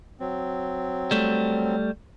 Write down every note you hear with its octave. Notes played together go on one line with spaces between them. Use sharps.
F#3 C4
G3 A3